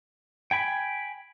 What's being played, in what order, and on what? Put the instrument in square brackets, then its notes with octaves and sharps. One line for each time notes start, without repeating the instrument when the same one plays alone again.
[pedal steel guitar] G5 G#5 B5